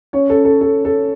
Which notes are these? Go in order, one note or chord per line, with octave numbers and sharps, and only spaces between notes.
C#4 C#5
A4
A4
A4
A4